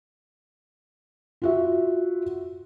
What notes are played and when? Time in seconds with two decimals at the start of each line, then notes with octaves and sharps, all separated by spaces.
1.42 F4 F#4 E5